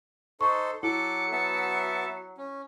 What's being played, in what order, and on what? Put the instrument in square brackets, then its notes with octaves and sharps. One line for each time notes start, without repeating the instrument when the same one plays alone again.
[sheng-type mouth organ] D#4 A4 C5 [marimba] C#6
[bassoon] F#3 [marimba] E4 [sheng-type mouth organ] A4 D6 [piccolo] C#7
[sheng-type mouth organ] B3 E5 A5
C#4